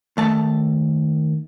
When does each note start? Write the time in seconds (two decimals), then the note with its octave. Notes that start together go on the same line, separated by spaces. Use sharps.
0.17 D#2 A3 A5